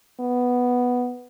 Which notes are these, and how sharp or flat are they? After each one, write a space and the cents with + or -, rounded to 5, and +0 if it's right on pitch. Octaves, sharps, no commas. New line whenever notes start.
B3 +0